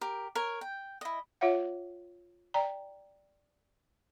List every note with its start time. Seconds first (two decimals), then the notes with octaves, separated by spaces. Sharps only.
0.01 G4 A#4
0.35 A#4 C#5
0.61 G5
1.01 E4 D#5
1.41 F4 C#5 E5 F#5
2.54 D5 G5 A#5